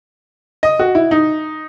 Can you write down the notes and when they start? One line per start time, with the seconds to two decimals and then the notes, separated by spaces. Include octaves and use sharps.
0.63 D#5
0.79 F#4
0.95 E4
1.11 D#4